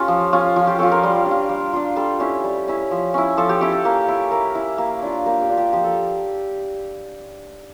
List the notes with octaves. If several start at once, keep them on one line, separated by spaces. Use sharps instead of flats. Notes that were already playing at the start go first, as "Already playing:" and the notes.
Already playing: C#4 F4 G4 A4 C#5
F3
C#4 F4
F3 F4
G4
C#4 F4 A4
A#4
G3
D4
F4
G3
D4 F4
G3 A4
C#4 E4 G4
G3
C#4 E4
F3
C#4 E4
F3 A4
G4
C#4 E4 G4
A4
A#3
E4
A#3 A#4
E4
A#3
D4 F4
A#3 G4
G4
D4 F4
G4
F3 G4
A4